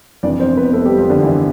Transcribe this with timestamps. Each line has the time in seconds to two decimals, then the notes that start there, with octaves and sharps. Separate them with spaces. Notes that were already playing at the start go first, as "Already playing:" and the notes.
0.23 F1 F2 E3 D4 D5
0.39 C4 C5
0.57 B3 B4
0.73 A3 A4
0.85 G3 G4
0.98 F3 F4
1.10 D3 D4
1.23 E3 E4